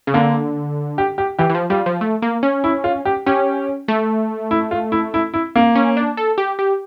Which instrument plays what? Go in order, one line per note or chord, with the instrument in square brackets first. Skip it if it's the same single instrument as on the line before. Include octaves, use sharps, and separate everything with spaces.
[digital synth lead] C#3
[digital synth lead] D3 [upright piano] A#3
[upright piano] G4
G4
[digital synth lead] E3 [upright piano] G4
[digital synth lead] E3
F3
[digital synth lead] G3 [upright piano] F4
[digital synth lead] F3
A3
A#3
C#4
[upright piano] E4
F4
G4
[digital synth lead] C#4 [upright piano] G4
[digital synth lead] A3
[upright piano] E4
F4
E4
E4
E4
A#3
[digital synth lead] C#4
D4
A4
G4
G4